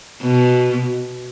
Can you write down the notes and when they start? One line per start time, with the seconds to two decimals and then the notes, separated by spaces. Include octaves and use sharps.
0.21 B2